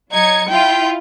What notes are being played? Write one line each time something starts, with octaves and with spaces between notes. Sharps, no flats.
F#3 D#4 G#6 C#7
E4 F4 G5